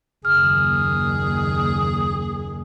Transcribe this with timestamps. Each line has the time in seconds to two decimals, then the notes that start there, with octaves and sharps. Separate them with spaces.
0.25 F#1 D#2 G#4 F6